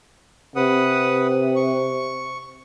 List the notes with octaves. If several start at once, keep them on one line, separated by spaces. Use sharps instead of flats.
C3 B4 F#5 D#6
C#6